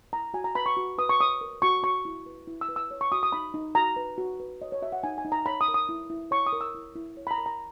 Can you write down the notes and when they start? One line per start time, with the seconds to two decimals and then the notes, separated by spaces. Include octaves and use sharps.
0.13 E4 A#5
0.34 F#4 G#5
0.44 A#5
0.55 B4 B5
0.66 C#6
0.77 F#4
0.98 B4 D#6
1.09 C#6
1.20 C#5 D#6
1.41 A#4
1.62 F#4 C#6
1.83 F#4 C#6
2.05 E4
2.26 B4
2.48 E4
2.61 E6
2.68 B4
2.76 E6
2.91 C#5
3.01 C#6
3.12 F#4 D#6
3.23 D#6
3.32 D#4 B5
3.54 D#4
3.75 F#4 A#5
3.96 B4
4.18 F#4
4.40 B4
4.62 C#5 D#5
4.72 C#5
4.82 F#4 E5
4.92 F#5
5.03 D#4 G#5
5.18 G#5
5.25 D#4
5.32 A#5
5.46 C#5 B5
5.61 D#6
5.68 A#4
5.74 D#6
5.89 E4
6.10 E4
6.31 C#5 C#6
6.47 D#6
6.53 A#4
6.61 E6
6.75 E4
6.96 E4
7.17 C#5
7.27 B5
7.31 A#5
7.38 A#4
7.46 A#5